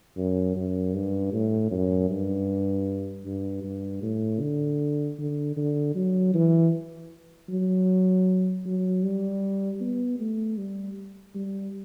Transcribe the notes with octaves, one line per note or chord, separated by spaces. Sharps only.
F#2
F#2
G2
A2
F#2
G2
G2
G2
A2
D3
D3
D3
F#3
E3
F#3
F#3
G3
B3
A3
G3
G3